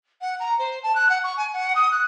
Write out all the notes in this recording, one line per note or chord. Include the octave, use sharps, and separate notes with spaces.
F#5
A#5
C5
A5
F#6
F#5
C#6
G#5
F#5
D#6
F#6